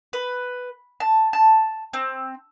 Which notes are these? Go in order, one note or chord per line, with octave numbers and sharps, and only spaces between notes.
B4
A5
A5
C4